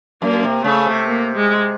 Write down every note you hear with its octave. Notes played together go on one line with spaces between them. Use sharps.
F#2 A#3
C3
C#3 A3
C3
A#3
G#3